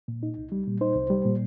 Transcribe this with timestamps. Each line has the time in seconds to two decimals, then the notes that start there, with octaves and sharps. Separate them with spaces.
0.08 A#2
0.23 D#4
0.37 C2
0.52 G3
0.67 A#2
0.81 D#4 C5
0.96 C2
1.10 G3
1.25 A#2